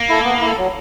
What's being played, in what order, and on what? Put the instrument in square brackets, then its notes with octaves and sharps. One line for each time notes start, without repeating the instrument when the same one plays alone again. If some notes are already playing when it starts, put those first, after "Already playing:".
Already playing: [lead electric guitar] A#3
[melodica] E4 A4
B3
E4 A4
F#3